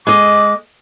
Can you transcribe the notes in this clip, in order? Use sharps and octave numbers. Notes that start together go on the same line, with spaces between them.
G#3 D#5 D6